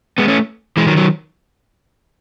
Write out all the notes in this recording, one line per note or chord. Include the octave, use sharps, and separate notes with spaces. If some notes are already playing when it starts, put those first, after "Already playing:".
G#3 B3
A3 C#4
E3 G#3
D#3 F#3
D#3 F#3